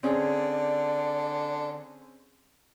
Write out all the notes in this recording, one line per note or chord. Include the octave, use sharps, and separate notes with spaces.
D3 C4 C#4 G#4 D5